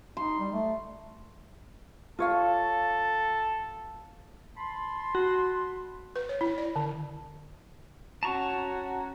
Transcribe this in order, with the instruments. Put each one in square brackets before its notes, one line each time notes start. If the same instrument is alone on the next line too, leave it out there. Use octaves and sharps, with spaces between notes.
[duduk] D#4 [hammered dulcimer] C6
[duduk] G3
A3
[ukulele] F4 C#5 F5 [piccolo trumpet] A4
[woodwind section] A5 B5 C6
[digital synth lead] F#4
[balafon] B4
C#5
E4
D5
D3
[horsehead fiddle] C#4 F#4 [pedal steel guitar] A5 A#5 C#6